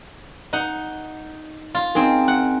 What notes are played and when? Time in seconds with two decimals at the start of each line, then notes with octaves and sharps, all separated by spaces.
0.53 D#4 F#5
1.75 F4
1.95 C4 C#4 D#4 G#4 A#4
2.28 F#5